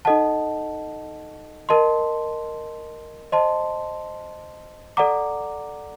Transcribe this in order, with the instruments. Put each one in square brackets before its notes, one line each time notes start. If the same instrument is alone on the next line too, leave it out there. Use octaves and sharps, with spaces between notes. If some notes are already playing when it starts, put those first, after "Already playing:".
[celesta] D#4 A4 D#5 F#5 A5
A#4 D#5 A5 C6
C5 D#5 A5 C6
A4 D5 F#5 A#5 D6